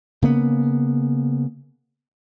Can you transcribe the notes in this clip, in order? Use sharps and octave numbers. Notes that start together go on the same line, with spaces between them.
C#3 A#3 B3